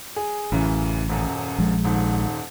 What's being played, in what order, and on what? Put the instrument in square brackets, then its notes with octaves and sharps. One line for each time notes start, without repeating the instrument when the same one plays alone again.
[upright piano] G#4
[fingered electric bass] A1 [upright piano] F#2 C#3 E3
[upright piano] D#1 F#2
[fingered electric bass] A#1 F3 G#3
[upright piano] D#1 G#2